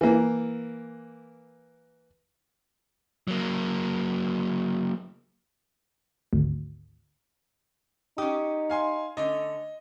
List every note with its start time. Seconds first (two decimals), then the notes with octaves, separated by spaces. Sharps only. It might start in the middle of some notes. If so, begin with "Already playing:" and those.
0.01 E3 A#3
3.28 F#3 A#3
6.33 G#1 D2
8.18 C#4 D#4 G4 D#6
8.70 F5 G#5 C6
9.17 D3 A3 C#4 D#5